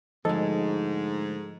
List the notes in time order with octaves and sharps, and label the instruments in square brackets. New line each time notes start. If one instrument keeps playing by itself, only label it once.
[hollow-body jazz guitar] D2 G#3 [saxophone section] G#2 [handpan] F3 D#5 [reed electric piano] A4